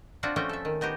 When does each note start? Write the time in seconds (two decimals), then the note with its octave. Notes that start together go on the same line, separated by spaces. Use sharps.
0.23 C4 D4 F4 F#4 F#5
0.36 F3 A3 C4 C#4 F#4 G5
0.49 A4 E5
0.65 D#3
0.81 B3 D#4 F#4 G4